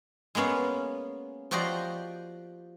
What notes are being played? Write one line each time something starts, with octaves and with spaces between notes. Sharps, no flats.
G#3 A#3 B3 C#4 F5
F3 F#4 G4 D5 D#5 C6